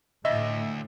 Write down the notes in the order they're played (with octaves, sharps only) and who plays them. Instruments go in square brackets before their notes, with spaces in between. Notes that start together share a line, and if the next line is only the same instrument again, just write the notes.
[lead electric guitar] D2 [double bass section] A2 [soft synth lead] D#5 [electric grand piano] E5